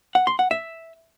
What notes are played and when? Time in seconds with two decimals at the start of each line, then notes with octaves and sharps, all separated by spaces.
0.15 F#5
0.27 C6
0.39 F#5
0.51 E5